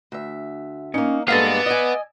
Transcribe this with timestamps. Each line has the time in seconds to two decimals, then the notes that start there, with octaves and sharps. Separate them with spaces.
0.12 D2 E5
0.94 A#3 C#4 D#4
1.28 G2 G#3 A#3 B3 A4 F5
1.46 D5 E5
1.66 D#5 G#5